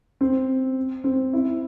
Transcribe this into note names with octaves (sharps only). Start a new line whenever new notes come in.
C4
C4
E4